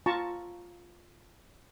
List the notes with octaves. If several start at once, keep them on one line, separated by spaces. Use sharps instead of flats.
F4 A5 A#5 C#6